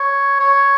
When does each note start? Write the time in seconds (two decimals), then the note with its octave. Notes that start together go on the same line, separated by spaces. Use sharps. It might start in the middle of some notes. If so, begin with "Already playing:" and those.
Already playing: C#5
0.40 C#5